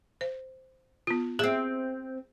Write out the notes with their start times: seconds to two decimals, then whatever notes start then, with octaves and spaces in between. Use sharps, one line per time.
0.21 C5
1.07 B3 F4
1.39 C4 G#4 E5